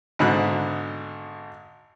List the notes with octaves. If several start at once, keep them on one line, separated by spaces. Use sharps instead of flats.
G#1 G#2 B2 D3 B5 F#6